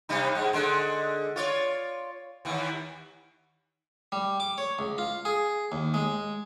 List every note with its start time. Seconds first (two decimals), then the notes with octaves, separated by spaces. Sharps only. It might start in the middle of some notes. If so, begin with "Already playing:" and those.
0.09 C3 G3 D#4
0.35 G#2 G#3
0.53 D3 G#3
1.36 F4 C#5 D5
2.45 D#2 E3
4.12 G3
4.40 D6
4.58 C#5
4.79 C#2
4.98 F4
5.25 G#4
5.72 D#2
5.94 G#3